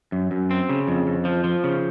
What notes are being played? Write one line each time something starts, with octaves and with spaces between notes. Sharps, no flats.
F#2
F#2
C4
C#3
F2
F2
F3
F3
C#3